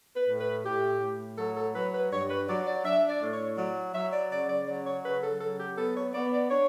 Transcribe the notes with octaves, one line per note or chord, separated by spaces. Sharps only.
B4
A2
B4
A2 G4
A2
F#3 A4
A4
F#3 B4
B4
G2 C#5
B4
F#3 D5
D5
D4 E5
D5
A2
C#5
F#3 D5
F#3 E5
D5
C#3 D5
D5
F#3 D5
C#5
C#3 B4
A4
F#3 A4
G4
B3 A4
C#5
B3 D5
D5
D4 C#5